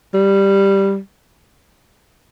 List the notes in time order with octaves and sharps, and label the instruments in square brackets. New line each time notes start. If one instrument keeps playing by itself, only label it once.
[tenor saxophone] G3